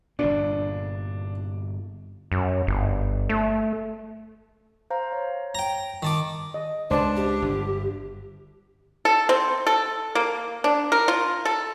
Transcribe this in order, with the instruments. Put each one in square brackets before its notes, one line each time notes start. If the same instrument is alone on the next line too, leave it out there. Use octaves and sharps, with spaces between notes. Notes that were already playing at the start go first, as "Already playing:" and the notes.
[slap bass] G1 A#2 [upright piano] D4
[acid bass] F#2
G1
A3
[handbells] C5 F5 A#5
C#5
[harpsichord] G5 A#5
D#3 A5 D6
[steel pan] D#5
[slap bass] C#2 [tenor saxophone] D4 [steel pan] C5 D5 [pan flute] A5
[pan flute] G4
[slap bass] G1
[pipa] A4
C4
A4
A#3
D4
A#4
F4
A4